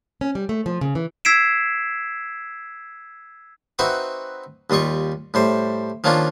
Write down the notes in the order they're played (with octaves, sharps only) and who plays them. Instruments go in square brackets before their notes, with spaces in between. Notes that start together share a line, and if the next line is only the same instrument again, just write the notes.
[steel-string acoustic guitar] C#4
G3
A3
F3
C#3
E3
[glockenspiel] E6 G#6 B6 C7 D7 E7
[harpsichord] C4 D#4 F#4 B4 E5 F#5
D#2 G3 F4 D#5 C#6
A2 G3 C5
D#3 F3 A#3 C#4 D4 F4